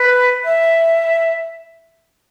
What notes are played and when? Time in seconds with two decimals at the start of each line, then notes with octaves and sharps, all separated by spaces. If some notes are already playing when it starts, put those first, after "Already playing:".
Already playing: B4
0.44 E5